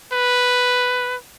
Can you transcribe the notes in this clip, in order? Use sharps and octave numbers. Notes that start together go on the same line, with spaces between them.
B4